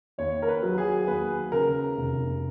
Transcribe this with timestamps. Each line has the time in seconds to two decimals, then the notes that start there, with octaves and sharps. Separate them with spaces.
0.18 D#2 C#5
0.42 A#4
0.48 B4
0.63 F#3
0.78 G#4
1.07 D#2 B4
1.52 C#3 A#4
1.97 F1